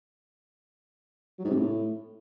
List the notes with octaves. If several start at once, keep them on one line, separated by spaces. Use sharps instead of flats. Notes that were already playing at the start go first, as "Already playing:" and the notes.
F#3
G#2
C3
A2